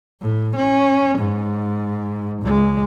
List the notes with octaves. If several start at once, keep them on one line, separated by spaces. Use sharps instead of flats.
A2
C#4
G#2
C#2 G#3